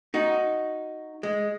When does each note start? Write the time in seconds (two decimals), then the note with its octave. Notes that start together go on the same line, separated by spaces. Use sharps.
0.14 D#4 F#4
1.23 G#3